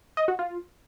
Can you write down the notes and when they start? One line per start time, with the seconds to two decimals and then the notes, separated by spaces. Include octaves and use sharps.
0.17 D#5
0.28 F#4
0.39 F4